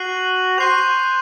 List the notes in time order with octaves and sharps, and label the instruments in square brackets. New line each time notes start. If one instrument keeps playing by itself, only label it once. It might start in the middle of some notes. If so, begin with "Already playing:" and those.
Already playing: [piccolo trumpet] F#4 [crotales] F#6 C7 D#7 F#7
[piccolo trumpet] C5 [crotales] C#6 F#6 C7 F7